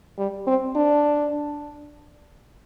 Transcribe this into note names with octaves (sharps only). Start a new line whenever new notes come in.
G3
C4
D4